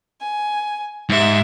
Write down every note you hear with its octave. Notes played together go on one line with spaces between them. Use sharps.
G#5
G#2 G4 E5